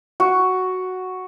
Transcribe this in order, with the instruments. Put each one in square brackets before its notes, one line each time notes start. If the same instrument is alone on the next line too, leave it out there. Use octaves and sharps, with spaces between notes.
[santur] F#4